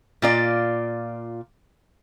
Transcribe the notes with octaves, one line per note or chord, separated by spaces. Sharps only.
A#2 F4 D5